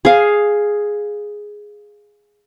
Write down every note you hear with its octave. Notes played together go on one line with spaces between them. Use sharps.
G#4 F5